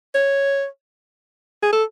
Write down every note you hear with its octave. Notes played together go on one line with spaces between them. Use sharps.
C#5
G#4
A4